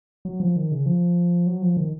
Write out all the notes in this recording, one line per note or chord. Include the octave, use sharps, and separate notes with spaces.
F#3
F3
D#3
C#3
F3
F#3
F3
D#3